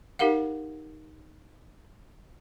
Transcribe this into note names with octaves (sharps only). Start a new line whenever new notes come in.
D#4 G4 A#4 F5 F#5